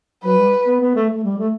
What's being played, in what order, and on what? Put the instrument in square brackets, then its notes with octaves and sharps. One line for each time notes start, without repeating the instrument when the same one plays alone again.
[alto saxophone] F#3 [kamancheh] B4
[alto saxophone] G3
B3
B3
A3
A3
G3
A3